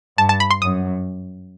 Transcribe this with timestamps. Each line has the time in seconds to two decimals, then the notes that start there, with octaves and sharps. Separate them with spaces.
0.18 G2 A5
0.29 A5
0.40 B5
0.51 C6
0.62 F#2 D#6